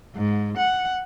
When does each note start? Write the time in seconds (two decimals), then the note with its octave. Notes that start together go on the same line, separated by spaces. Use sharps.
0.16 G#2
0.58 F#5